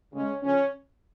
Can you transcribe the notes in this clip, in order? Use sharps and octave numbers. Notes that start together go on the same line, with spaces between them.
C#3 G#3 C#4
C#3 F3 C#4